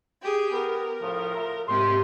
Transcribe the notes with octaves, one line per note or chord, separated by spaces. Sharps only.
G4 G#4
B3 A#4
A2 C#3 F3
F4 E5 A#5
G#2 C3 G4 C6